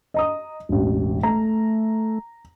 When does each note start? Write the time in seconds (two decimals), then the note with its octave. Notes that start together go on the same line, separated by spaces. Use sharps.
0.14 D#5 A#5 D#6
0.69 E1 A1
1.23 A3 A#5